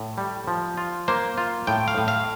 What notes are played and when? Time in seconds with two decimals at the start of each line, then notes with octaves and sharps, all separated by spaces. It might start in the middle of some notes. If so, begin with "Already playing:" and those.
Already playing: A2
0.18 G3
0.47 F3
0.77 F4
1.08 A#3 C5
1.38 F4
1.67 A2 G5
1.88 F5
1.98 A2
2.08 F5